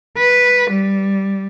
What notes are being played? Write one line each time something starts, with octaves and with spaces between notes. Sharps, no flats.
B4
G3